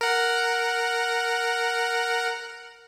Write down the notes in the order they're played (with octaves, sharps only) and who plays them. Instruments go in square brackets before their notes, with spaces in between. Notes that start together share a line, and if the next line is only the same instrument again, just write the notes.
[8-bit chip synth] A#4 F#5